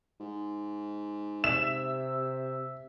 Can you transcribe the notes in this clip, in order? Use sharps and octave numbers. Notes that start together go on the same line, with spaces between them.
G#2
C3 E5 E7